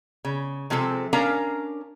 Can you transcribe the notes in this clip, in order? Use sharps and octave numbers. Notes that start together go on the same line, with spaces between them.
C#3
C3 F3 G#3 C4 A4
C#4 D4 A#4 F5 A#5